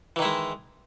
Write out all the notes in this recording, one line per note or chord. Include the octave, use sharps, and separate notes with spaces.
D#3 E3 G#3 E4